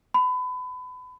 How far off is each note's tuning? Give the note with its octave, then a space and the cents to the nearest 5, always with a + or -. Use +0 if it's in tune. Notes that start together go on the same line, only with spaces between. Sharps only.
B5 +30